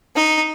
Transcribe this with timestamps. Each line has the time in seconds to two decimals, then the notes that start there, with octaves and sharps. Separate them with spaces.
0.16 D#4